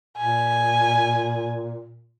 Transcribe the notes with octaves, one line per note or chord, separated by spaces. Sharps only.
A#2 G#5